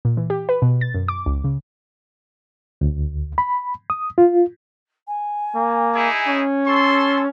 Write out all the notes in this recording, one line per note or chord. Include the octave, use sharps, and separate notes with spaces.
A#2
E3
G4
B4
B2
A6
F#2
D6
C#2
C#3
D2
B5
D#6
F4
G#5
A#3
D#4 E4 G#4
C#4
A4 C6 C#6